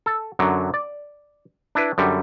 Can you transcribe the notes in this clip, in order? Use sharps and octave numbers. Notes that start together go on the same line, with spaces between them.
A4
F#2 D3 F#3
D5
D4 E4 B4
F#2 D3 G3